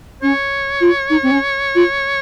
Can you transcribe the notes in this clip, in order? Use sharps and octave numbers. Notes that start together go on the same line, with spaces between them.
C#4 C#5
F4
D#4
C4
C#4
F4